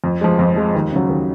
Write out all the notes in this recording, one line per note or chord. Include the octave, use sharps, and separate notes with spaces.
F2
F3 G#3
F2
F3 G#3
D#2
C#3 F#3
D#2